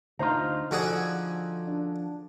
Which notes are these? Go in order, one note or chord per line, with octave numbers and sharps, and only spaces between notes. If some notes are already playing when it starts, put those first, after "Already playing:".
D2 D#4 F4 C5 A#5
D3 F3 F#4 G#4
D4